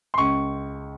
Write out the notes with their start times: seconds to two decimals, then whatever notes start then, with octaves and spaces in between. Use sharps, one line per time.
0.14 C6
0.18 C#2 C#6